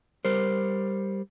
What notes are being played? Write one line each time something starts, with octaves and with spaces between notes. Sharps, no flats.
G3 A#4 C5